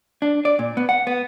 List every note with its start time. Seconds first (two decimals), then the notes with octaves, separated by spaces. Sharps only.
0.22 D4
0.45 D5
0.59 A#2
0.77 B3
0.89 F#5
1.07 B3